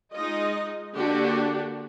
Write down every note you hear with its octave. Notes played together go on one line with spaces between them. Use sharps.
G#3 D#4 F4 D#5
D3 A#3 D4 F#4 G4